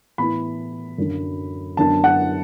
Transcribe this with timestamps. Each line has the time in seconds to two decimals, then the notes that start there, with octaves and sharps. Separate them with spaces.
0.18 A2 E3 B3 E4 B5
0.98 F#2 D3 F#3
1.77 F#2 D3 B3 D4 A5
2.04 F#5